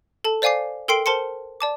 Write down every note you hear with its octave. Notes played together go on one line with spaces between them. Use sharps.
A4 A5
C5 D5 F5 G#5 D6 C7
A4 A#4 G5 C6 C7 D7
A#4 C5 A5 C6 C#7
D5 A5 D6